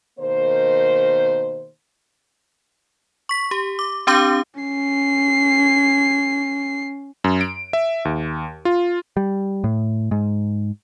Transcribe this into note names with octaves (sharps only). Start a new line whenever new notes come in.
B2 D#3 A#3 C5
C#6 B6
G4
D6
C4 D4 G4 F5 D6 G6
C#4 C7
F#2
D7
E5
D#2
F4
G3
A2
G#2